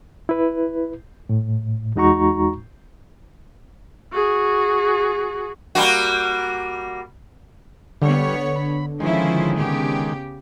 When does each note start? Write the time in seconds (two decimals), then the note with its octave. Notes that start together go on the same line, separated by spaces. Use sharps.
0.29 E4 B4
1.29 A2
1.96 E2 G#3 D#4 F#4 A#5 C#6
4.12 F#4 G#4
5.75 G3 A#3 F#4
8.02 D3 G3 B3 C#5
8.56 B5
9.00 D#3 F3 G#3 C#4 E4
9.58 C#3 B3 G4